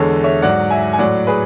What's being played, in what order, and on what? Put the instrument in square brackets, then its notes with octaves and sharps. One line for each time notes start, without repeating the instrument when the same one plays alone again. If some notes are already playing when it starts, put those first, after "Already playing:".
Already playing: [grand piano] E2 D3 G#3 A4 C#5
C#5 E5
G#2 F#3 D5 F#5
E5 G#5
G#5
A2 F#3 D5 F#5
G#4 B4